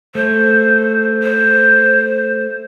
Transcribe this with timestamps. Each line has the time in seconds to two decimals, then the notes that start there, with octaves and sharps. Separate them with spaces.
0.15 A3 C5
1.23 C5